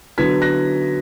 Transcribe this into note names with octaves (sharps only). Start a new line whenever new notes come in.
D3 F#3 B3 G#6 B6
F#6 A#6